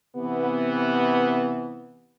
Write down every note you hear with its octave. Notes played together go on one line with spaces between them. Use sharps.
C3 E3 B3